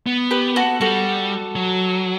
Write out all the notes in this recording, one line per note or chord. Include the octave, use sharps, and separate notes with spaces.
B3
G4 B4
F#4 A4
G3 F#4 A4
F#3